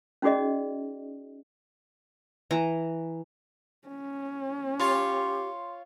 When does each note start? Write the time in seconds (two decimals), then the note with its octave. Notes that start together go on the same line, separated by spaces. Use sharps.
0.22 C#4 D#4 F#4 G#4 D5 D#5
2.51 E3 A#5
3.88 C#4
4.80 F4 G4 C#5 C6